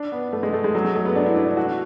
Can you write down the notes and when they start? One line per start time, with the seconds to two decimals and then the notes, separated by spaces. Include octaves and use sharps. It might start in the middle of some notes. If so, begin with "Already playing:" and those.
Already playing: D4
0.12 B3
0.33 A3
0.43 G#3
0.53 A3
0.64 G#3
0.75 F#3
0.85 G#3
0.95 A3
1.05 B3
1.15 D4
1.26 E4
1.36 D4
1.47 E4
1.57 F#4